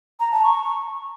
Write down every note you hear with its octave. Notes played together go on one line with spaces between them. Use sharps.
A#5
A5
C#6